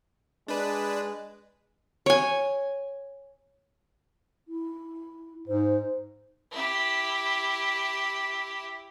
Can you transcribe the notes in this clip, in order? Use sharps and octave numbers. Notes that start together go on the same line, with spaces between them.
G#3 D4 B4
C#5 G#5
E4
G#2 C5
E4 G4